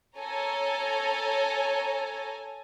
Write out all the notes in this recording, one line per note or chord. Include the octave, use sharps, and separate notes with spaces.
A4 C#5 G#5 A#5